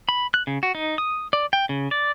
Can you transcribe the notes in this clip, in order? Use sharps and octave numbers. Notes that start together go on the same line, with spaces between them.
B5
F#6
C#3
F#4
D#4
D#6
D5
G5
C#3
D5